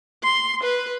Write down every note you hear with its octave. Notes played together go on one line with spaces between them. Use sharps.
C6
B4